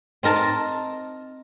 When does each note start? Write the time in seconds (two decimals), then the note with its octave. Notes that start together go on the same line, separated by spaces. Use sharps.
0.23 C4 D#4 A#4 A5